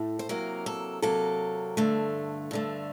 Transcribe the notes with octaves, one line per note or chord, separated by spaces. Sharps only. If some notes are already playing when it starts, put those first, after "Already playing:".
Already playing: A2 A3
C5
C3 F#3 A#3 A#4
A4
C3 F#3 A#3 A4
G2 D3 A3
G2 D3 A3